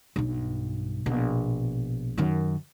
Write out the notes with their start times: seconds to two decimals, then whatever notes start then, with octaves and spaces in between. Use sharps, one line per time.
0.16 B1 G2
1.06 A#1 B2
2.18 F#2 D#3